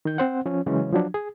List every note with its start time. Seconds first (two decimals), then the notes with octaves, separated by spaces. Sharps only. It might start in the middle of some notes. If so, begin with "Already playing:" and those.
0.05 D#3 G6
0.18 C4 C5 F#5
0.46 F3 C#4
0.66 C#3 E3 F#3 G#3 C#4
0.93 F3 F#3 D4
1.14 G#4